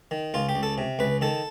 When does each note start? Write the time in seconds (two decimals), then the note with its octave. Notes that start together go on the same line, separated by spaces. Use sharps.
0.11 D#3
0.34 C#2 F4
0.49 G4
0.55 C#2
0.63 A4
0.78 C3
0.99 C#2 B4
1.21 D#3 A4